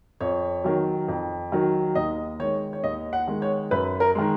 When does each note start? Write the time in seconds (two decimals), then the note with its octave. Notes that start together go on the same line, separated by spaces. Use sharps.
0.21 F2 C#5
0.64 D#3 F#3
1.08 F2
1.52 D#3 F#3
1.95 D#2 D#5
2.40 D#3 G#3 C#5
2.73 C#5
2.83 D#2 D#5
3.13 F#5
3.28 D#3 G#3
3.42 C#5
3.71 F#2 B4
4.00 A#4
4.15 D#3 G#3